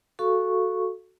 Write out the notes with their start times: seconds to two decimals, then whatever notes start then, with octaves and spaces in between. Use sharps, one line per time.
0.19 F#4 A4 F5 C#6